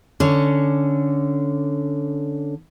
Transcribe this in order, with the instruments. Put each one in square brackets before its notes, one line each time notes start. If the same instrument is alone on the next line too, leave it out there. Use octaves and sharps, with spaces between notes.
[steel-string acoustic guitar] D3 C#4